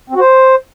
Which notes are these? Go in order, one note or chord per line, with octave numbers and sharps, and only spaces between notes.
C4
F#4
C5